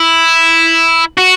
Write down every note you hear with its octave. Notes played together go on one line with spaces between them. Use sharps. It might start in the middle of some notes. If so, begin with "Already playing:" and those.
Already playing: E4
F#4